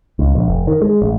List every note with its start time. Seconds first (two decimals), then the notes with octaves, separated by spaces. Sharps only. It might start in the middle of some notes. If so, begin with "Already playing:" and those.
0.19 C#2
0.35 A#1
0.48 F1
0.67 D#3
0.82 G#3
1.02 A1